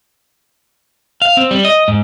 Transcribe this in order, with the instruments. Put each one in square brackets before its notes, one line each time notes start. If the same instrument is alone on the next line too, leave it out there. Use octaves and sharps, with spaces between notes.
[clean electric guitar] F5
C4
G3
D#5
G#2